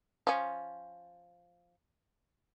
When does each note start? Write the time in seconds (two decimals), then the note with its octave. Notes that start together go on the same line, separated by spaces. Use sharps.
0.27 F3 C#4